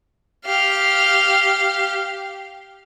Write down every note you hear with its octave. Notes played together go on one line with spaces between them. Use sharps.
G4 F5